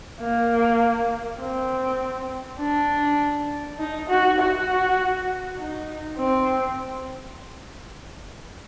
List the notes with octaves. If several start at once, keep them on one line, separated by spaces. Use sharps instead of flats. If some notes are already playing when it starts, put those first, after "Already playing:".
A#3
C4
D4
D#4
F#4
F#4
D#4
C4